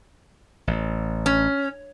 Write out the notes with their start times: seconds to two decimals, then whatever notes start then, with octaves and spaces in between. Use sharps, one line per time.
0.67 A1
1.26 C#4